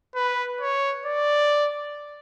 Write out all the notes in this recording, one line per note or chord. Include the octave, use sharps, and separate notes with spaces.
B4
C#5
D5